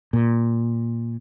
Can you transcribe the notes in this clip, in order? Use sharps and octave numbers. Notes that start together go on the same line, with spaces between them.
A#2